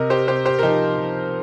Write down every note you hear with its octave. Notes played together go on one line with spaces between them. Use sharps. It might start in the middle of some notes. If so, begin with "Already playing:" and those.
Already playing: C3 A#4 D#5
G4 C5
C3 G4 C5
G4 C5
A#4
F3 D#4 G4
F3